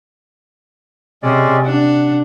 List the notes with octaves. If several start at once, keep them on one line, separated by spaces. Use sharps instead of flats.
C3 G#3 C#4 D5
D4 F#5